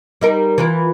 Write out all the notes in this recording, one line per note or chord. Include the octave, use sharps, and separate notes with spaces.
G3 D#4 A#4
E3 F4 A#4